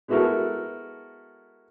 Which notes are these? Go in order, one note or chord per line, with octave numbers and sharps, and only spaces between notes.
G#3 B3 E4 F#4 A4 A#4